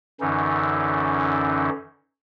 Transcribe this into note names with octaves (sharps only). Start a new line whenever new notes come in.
F#2 D3 E3 C#4 D#4